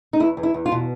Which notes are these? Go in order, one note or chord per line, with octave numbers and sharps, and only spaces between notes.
D#4
E2 E4
E2
E4
E2
F4
B2